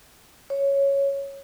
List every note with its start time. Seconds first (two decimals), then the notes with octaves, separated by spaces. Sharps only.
0.50 C#5